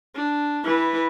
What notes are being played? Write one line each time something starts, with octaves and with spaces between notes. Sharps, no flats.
D4
E3 B4